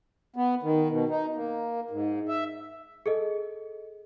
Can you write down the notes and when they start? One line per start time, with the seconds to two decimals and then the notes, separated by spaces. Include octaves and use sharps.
0.36 B3
0.63 D#3
0.89 B2
1.09 D#4
1.35 A#3
1.91 G#2
2.28 E5
3.06 G#4 A4 D#5